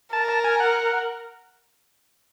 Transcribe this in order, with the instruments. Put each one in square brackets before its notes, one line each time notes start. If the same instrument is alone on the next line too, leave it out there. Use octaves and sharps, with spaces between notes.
[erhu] A#4 [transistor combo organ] A5
[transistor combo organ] A5
G#5
F#5